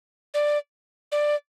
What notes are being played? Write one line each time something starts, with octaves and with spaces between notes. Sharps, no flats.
D5
D5